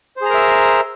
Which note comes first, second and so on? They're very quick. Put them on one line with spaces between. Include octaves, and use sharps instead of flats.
C5 G#4 A#5 A#4 E5